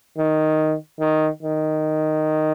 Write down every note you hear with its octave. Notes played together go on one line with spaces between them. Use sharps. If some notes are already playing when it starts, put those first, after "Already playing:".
D#3
D#3
D#3